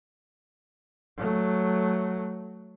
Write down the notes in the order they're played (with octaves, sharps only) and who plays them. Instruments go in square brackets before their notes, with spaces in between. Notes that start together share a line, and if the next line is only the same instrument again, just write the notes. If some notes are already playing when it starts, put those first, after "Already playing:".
[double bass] F#3 A3